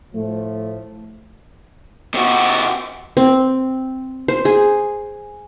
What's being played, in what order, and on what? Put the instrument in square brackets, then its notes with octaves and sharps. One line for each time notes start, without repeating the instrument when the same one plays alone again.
[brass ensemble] A2 F3 A3
[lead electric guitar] C3 F#4
[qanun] C4
C5
G#4